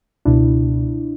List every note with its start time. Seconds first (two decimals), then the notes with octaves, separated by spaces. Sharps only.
0.25 C#2 B2 D4 E4